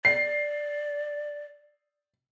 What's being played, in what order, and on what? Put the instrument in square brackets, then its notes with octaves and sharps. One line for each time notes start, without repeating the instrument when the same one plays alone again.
[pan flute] D5 [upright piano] C7